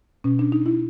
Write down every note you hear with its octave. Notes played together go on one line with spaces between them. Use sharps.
B2 C#4
D4
D#4
E4